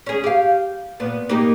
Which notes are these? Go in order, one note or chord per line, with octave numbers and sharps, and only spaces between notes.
C#4 G#4
G4 F5
A#2 B3
A#3 D#4 G4